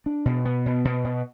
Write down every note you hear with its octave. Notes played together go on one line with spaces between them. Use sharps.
D4
B2
B3
B2
B2
B2